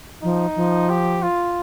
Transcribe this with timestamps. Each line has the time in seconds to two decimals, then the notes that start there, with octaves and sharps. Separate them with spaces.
0.22 F3 D#4
0.56 F3
0.90 G4
1.22 F4